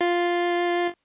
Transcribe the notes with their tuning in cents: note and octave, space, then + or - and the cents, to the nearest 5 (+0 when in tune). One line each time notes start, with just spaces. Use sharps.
F4 +0